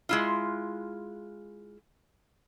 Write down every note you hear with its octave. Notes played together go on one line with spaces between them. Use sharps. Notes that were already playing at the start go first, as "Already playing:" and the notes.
G#3 E4 F4